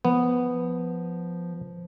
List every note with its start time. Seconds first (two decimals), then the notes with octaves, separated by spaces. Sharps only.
0.05 F3 B3